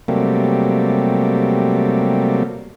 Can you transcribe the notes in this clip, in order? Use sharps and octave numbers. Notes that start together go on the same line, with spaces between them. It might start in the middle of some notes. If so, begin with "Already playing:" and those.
C3 F#3 G3 A3 A#3